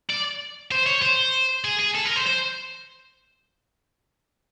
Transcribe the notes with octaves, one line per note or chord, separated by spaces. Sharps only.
D5
C5
C#5
C5
G#4
G#4
A4
A#4
C5
C5